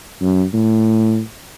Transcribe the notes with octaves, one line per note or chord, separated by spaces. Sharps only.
F#2
A2